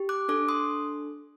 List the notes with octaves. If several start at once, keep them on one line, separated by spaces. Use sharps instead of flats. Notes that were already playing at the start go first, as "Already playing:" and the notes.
Already playing: G4
D6 F#6
D4 A4 D6 F#6
C6 D#6